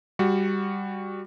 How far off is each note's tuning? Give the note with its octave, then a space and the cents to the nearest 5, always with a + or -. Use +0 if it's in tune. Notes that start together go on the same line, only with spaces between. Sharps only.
G3 +10 F#4 +0